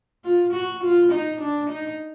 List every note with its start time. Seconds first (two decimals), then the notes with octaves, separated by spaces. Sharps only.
0.24 F4
0.53 F#4
0.83 F4
1.11 D#4
1.40 D4
1.69 D#4